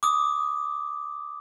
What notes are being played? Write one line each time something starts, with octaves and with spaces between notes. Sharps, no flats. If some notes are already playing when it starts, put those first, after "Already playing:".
D6 D#6